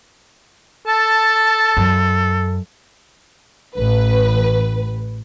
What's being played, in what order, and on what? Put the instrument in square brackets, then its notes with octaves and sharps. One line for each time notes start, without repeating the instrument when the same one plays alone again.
[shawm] A4 [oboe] A5
[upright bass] F#2
[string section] A1 B4